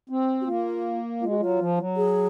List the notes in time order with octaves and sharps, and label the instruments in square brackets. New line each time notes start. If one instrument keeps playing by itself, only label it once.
[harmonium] C4
[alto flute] F#4
[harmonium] A#3 [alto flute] F4
[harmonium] G#3 [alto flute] F4
[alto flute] F#4
[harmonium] F#3 [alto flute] F4
[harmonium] F3
F#3
[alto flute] G#4